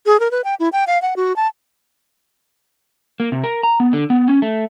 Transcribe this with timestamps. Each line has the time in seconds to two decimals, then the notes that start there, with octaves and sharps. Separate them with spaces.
0.06 G#4
0.20 A#4
0.31 B4
0.44 G5
0.60 E4
0.73 G5
0.87 F5
1.02 F#5
1.16 F#4
1.36 A5
3.20 A#3
3.32 C3
3.43 A#4
3.63 A#5
3.80 B3
3.93 D3
4.10 B3
4.28 C#4
4.42 A3